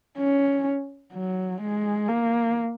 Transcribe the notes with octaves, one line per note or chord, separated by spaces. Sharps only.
C#4
F#3
G#3
A#3